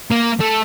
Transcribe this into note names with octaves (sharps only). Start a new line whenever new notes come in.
A#3
A3